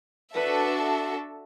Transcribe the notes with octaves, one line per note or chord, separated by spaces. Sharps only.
D4 F#4 A4 B4 E5